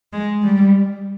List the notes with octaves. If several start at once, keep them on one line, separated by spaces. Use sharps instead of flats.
G#3
G3